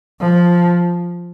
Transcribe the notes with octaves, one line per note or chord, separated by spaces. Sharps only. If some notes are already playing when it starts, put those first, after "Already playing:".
F3